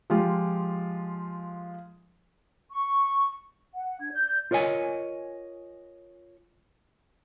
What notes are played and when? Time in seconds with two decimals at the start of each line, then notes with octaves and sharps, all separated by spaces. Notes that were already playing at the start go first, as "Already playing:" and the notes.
0.10 F3 G#3 F4 G4
2.71 C#6
3.74 F#5
4.00 D4 G#6
4.12 D5 G6
4.51 F4 A#4 C#5 D#5 G#5